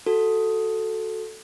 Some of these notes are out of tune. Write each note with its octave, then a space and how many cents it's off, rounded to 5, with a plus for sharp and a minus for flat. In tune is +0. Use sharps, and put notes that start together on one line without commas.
F#4 +0 A4 +0